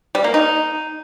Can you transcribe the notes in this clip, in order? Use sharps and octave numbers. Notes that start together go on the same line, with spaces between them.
G3
A#3
D#4